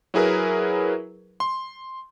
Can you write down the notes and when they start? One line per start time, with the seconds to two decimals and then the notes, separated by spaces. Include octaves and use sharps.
0.14 F#3 E4 G#4 A#4 B4
1.40 C6